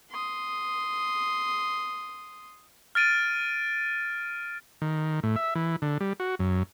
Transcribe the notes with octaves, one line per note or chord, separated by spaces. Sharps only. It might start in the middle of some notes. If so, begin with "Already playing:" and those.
C6 D#6
F6 A6 D7 D#7
D#3
A2
E5
E3
D3
G3
F#4
F#2